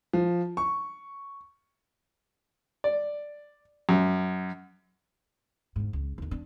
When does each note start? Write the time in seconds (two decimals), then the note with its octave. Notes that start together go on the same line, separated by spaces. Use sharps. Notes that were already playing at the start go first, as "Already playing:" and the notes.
0.13 F3
0.57 C#6
2.84 D5
3.89 F#2
5.76 G#2 D3
5.93 C#2
6.18 D#2 D3
6.31 D4